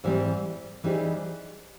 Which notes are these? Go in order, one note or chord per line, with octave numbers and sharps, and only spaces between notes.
G#2 E3 G3 C4
E3 G3 C4 D#4 G#4